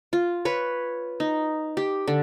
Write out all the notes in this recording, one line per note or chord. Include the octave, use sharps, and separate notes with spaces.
F4
B4 C#5
D#4
G4
D3